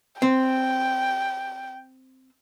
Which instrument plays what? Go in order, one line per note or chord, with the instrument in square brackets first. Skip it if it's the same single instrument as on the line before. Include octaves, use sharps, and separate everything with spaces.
[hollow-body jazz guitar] C4 [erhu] G5